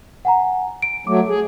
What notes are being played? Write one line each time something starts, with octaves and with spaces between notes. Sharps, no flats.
F#5 G#5 A#5
D7
F#3 A3 D6
G#4